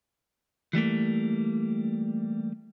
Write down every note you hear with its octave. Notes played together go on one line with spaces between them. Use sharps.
E3 G3 A3 A#3